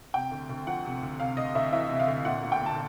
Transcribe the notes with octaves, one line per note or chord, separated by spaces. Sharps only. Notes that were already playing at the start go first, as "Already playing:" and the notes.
C3 G5
D2
D2
F3 F#5
C3
D2
C3 F5
D2 D#5
D2 E5
E3 E5
C3
F5
D2
A#2 F#5
B1
G5
B1
A5